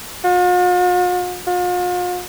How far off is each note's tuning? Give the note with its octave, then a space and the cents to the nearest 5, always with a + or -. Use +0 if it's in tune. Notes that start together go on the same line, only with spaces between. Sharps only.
F4 +45
F4 +40